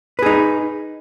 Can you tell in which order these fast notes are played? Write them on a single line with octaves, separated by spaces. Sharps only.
B4 G#4 D#4